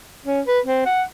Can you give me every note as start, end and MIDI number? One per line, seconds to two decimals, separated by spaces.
0.26 0.40 61
0.47 0.59 71
0.65 0.84 60
0.85 1.02 78